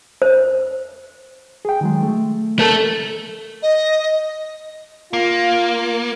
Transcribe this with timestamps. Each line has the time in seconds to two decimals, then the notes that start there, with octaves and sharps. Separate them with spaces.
0.22 C5
1.65 G#4 G5
1.81 D#3 F#3 G#3
2.03 A3
2.59 A3 A4 A#4 A5
3.63 D#5
5.13 A#3 F4